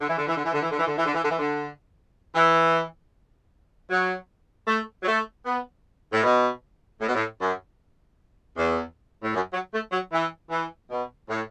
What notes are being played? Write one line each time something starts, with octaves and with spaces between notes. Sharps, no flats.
D3
E3
D3
E3
D3
E3
D3
E3
D3
E3
D3
E3
D3
E3
D3
E3
D3
E3
F#3
A3
F#3
A3
B3
A2
B2
A2
B2
A2
F#2
E2
A2
F#2
F#3
A3
F#3
E3
E3
B2
A2